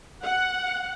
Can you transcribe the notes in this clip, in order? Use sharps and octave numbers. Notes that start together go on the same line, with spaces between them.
F#5